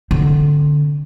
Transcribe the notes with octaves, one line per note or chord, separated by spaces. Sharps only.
D3 C4